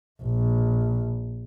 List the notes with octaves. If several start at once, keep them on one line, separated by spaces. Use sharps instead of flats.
A#1